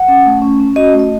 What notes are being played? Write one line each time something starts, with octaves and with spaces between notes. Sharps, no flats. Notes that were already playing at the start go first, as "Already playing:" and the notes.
Already playing: F#5
C#4
A3
C#4
C#4
F#4 D#5
A3
D#5